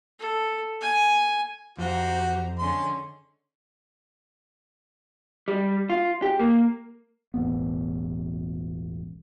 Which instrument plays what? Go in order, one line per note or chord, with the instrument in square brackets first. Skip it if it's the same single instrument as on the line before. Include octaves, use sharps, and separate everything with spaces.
[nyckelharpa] A4
G#5
[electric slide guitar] F2 [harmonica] F#4 [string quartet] G4 C5 A#5
[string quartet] D3 G#3 C#4 [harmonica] C6
[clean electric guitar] G3
F4
G4
A#3
[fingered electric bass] E1 A1 B3